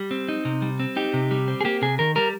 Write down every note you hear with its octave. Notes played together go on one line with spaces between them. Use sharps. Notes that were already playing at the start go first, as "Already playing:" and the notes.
Already playing: G3 G4
C4
D#4
C3
G3
C4
D#4 G4
C3
G3
C4
G#4
A#3 G4
C3 G#4
D#3 A#4
G3 A#4